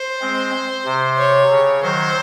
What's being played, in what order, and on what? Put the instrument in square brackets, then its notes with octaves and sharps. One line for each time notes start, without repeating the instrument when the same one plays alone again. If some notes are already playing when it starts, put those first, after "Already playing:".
Already playing: [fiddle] C5
[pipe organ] G#3 C4
C3
[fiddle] C#5
[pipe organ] C#3
[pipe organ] D#3 F#3 [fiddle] C5